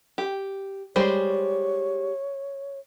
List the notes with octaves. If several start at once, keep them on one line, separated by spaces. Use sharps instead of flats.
G4
G3 G#3 C5 C#5